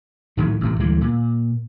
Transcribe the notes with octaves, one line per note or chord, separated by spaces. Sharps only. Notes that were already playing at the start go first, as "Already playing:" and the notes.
A2 D#3 E3 F#3
A1 A2 C3
D2 E3 G3 G#3
A#2